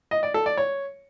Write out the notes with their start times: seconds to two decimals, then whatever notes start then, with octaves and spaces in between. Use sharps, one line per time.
0.11 D#5
0.23 D5
0.34 A4
0.46 D5
0.57 C#5